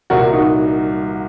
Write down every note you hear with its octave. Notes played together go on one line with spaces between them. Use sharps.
C2 A#2 F#4 A#4
D#4 F#4